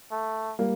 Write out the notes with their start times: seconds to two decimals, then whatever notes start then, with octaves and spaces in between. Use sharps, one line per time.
0.11 A3
0.59 G3 A#3